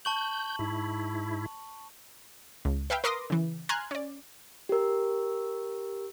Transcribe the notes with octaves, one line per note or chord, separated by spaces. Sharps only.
A5 C#6 G6 F#7
G#2 E4
C#2
B4 E5 F5 G5
A#4 B4 C6 D6 D#6 A#6
C#3 E3
G#5 A#5 C6 F6 F#6 G#6
C#4 D5
G4 A#4